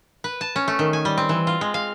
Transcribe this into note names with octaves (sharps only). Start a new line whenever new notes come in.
B4
A5
C#4
A3
D#3
G#5
G3
C4
E3
F4
G#3
F5